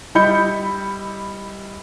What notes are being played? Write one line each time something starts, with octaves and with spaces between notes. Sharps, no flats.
G3 E4 D#5 B5 G6 C#7